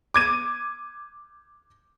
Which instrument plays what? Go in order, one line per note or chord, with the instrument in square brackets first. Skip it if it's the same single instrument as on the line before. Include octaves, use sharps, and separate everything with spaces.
[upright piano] D6 G#6 D#7